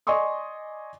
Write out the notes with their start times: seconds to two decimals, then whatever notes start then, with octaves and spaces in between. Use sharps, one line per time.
0.07 D5 D#5 G#5 C6 C#6 D#6